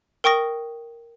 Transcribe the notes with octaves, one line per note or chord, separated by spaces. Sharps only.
A#4 G5 C#6 D#6 A#6